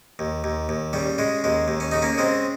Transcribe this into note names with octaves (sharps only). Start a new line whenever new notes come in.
D#2
D#2
D#2
C#3 G3
C#3 G#3
D#2 G#3
D#2
C#4
C#3 D#4
A#3 C#4
C#3 G#3 C4